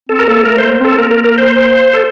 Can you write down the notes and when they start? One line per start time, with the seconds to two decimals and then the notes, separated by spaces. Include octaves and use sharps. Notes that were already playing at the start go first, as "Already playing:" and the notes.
0.09 C4 A4
0.19 A#4
0.27 A#3 A4
0.45 A3 A#4
0.58 A#3 C5
0.80 C4 A4
0.98 A#3 A#4
1.11 A#4
1.24 A#4
1.38 C5
1.93 A4